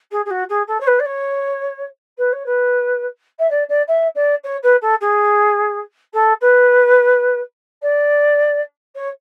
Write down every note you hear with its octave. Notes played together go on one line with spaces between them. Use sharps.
G#4
G#4
F#4
G#4
A4
C#5
B4
D5
C#5
B4
C#5
B4
E5
D5
D5
E5
D5
C#5
B4
A4
G#4
A4
B4
D5
C#5